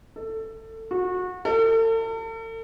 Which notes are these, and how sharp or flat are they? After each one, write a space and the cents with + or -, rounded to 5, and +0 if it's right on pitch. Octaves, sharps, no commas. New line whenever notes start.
A4 +20
F#4 -25
A4 +45